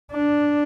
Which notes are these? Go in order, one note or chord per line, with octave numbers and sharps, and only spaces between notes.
D4